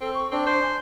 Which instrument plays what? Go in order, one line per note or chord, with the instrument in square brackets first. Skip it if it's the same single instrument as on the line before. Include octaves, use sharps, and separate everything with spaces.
[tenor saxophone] C4 [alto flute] A4
[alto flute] C#6
[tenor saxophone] C4 [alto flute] D4
[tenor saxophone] C5
[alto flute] G#5